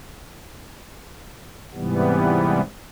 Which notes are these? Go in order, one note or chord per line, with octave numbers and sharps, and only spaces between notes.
G#2 C3 E3 G3 B3